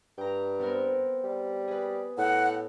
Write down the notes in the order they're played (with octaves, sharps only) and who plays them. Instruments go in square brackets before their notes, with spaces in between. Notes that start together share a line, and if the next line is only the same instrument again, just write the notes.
[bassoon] G2 [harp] G5 A#5
[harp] B3 C4 A#4
[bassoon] G3
[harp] G#4 B4
[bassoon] A2 [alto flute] F#5